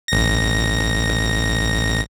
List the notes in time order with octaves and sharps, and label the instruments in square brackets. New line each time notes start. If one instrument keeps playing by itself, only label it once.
[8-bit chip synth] A1 A#6